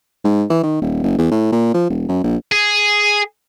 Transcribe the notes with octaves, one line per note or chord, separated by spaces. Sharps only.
G#2
E3
D#3
D#1
F#1
E2
A2
A#2
F3
E1
F#2
A#1
G#4